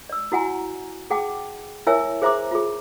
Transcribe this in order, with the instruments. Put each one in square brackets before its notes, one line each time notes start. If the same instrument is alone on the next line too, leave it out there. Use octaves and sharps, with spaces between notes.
[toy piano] D5 E6
E4 F#4 F#5 G#5 A#5
G#4 F#5 G5 A5 D6
E4 A#4 C#5 E5 G#5 E6
G#4 C5 E5 A#5 C6 D6
F4 G#4